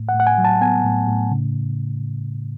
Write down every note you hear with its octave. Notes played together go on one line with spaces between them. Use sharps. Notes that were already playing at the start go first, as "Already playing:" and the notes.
Already playing: A2
F#5
A2
F#5
G#5
F#3
A5
B3 G#5
A2
A2
C#3